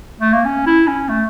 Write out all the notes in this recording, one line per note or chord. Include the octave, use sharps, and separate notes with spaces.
A3
A#3
C#4
E4
C#4
A3